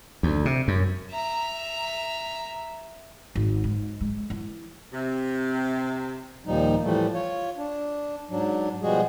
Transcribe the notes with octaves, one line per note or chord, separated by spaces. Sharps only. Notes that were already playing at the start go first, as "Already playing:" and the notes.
D2
C3
F#2
E5 A#5
G#1
G#2
G#3
E3
C3
D#2 A#2 F3 G3 D#4
A2 E3 F3 G3 A3
F4 C#5
D4
G#2 F#3 D4
B2 F3 G3 G#3 F#4 G#4